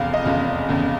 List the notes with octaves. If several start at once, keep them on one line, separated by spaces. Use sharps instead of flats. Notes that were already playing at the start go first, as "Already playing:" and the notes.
Already playing: F1 E2 C#3 F5
D#5
F1 E2 C#3 F5
F1 E2 C#3